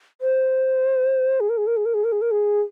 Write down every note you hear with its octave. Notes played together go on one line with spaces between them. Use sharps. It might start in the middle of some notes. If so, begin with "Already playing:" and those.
C5
G#4
A#4
G#4
A#4
G#4
A#4
G#4
A#4
G#4
A#4
G#4